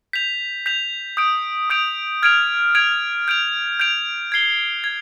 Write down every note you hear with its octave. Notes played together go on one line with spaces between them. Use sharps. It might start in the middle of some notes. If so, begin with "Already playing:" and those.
G6 B6 F7
G6 B6 F7
D#6 G6 D7 F7
D#6 G6 D7 F7
F6 G#6 D7 F7
F6 G#6 D7 F7
G6 D7 F7
G6 D7 F7
G#6 C7 G7
G#6